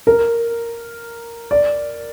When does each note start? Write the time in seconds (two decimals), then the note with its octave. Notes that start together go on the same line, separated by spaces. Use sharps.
0.07 A#4
1.51 D5